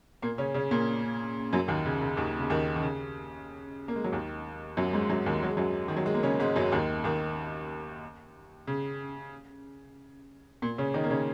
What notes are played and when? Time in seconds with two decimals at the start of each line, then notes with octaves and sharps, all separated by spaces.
0.22 A#2 A#3
0.38 C#3 C#4
0.54 C#3 C#4
0.71 A#2 A#3
1.53 F#2 F#3
1.68 D#2 D#3
1.85 C#3
2.01 C#3
2.17 D#2 D#3
2.40 C#3
2.50 D#2 D#3
2.76 D#3
2.82 C#3
3.88 A#3
3.96 G#3
4.04 F#3
4.12 D#2 D#3
4.77 F#2 F#3
4.93 G#2 G#3
5.09 F#2 F#3
5.26 D#2 D#3
5.42 F#3
5.49 G#3
5.57 F#2 F#3
5.88 D#3
5.97 F#3
6.06 G#3
6.14 A#3
6.23 C#3 C#4
6.40 G#2 G#3
6.56 F#2 F#3
6.72 D#2 D#3
7.04 D#2 D#3
8.67 C#3
10.62 A#2
10.78 C#3 C#4
10.94 D#3 D#4
11.04 A#3
11.10 C#3 C#4